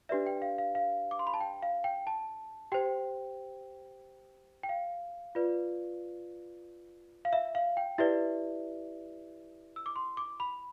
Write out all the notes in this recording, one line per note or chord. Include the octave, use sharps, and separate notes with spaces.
D4 G4 B4 D5 E5
G5
F5
F5
F5
D6
C6
B5
A5
G5
F5
G5
A5
G4 C5 G5
G5
F5
F4 B4 D5
F5
E5
F5
G5
E4 G4 B4 D5 E5
E6
D6
C6
D6
B5